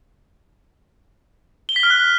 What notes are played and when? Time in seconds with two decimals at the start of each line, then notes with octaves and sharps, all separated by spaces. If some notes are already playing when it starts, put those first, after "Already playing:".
1.69 G7
1.76 B6
1.83 F6
1.90 F#6